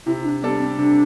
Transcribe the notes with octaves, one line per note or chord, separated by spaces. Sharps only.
C3 E4
D4
G3 B3 D4 A4
C4
C3 D4